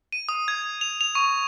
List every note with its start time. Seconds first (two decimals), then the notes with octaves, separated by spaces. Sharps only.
0.12 D#7
0.29 D#6
0.48 G#6
0.81 F7
1.01 F7
1.15 C#6